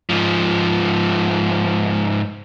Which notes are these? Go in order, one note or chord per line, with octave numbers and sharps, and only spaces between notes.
G#2 F3